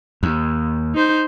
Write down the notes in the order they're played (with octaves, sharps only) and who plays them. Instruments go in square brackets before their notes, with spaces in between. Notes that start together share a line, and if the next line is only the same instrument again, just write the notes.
[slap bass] D#2
[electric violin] D#4 C5